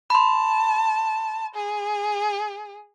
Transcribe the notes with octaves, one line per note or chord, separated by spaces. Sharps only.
A5 B5 C6
G#4